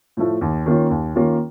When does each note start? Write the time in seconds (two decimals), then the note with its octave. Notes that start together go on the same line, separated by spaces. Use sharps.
0.17 A2 F3 A3
0.41 D#2
0.66 D#3 A#3 C#4 F4
0.90 D#2
1.15 D#3 A#3 C#4 F4